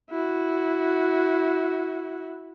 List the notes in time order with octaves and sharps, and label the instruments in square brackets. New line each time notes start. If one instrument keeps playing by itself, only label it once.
[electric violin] E4 F#4